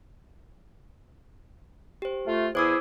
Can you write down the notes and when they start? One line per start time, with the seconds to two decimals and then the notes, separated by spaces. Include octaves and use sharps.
2.02 G4 C5
2.26 A3 F4
2.55 E2 E4 G#4 C5 D6 E6